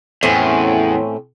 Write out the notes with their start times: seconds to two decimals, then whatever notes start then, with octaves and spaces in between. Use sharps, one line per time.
0.23 E2 A2 C4 C#4